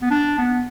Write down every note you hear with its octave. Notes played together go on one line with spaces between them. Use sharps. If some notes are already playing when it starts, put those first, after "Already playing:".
B3
D4
B3